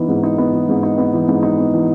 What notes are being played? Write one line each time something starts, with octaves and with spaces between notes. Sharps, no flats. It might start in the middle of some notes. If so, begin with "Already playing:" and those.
Already playing: E3 B3 D#4
G#2
D#4
B3
E3
G#2
D#4
B3
E3
G#2
D#4
B3
E3